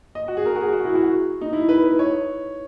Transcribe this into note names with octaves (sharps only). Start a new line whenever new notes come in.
D#5
F#4
G#4
A#4
F#4
G#4
F#4
E4
F#4
D#4
E4
B4
B4
C#5